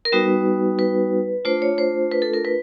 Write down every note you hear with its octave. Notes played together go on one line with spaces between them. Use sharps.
A#4
G3 B3 D#4 F#4 B4
B4
A3 D4 F4 C5
C#5
C5
B4
A4
A#4
B4